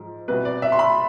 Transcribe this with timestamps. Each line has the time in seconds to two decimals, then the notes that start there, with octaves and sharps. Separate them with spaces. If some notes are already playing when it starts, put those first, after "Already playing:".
Already playing: G#2 F3
0.28 C2 B2 B4
0.45 D5
0.62 E5
0.72 C6
0.79 B5